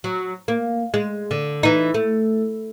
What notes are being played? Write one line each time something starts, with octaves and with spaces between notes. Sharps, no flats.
F#3
A#3
G#3
D3
E3 D#4
A3